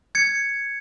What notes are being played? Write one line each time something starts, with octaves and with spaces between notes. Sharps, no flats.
G#6 C#7